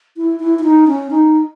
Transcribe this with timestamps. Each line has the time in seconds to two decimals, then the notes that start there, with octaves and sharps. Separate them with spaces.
0.17 E4
0.40 E4
0.59 E4
0.64 D#4
0.87 C#4
1.10 D#4